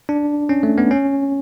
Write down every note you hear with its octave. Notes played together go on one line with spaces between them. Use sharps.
D4
C#4
A3
B3
C#4